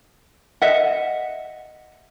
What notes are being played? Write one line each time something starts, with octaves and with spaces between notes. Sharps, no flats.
D#5 E5 F#5